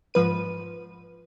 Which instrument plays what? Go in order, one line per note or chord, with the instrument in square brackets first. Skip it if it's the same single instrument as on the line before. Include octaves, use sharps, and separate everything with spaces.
[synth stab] G#2 F3 B4 D#7